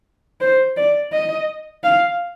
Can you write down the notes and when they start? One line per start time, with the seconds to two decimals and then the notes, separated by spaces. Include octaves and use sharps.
0.41 C5
0.77 D5
1.13 D#5
1.84 F5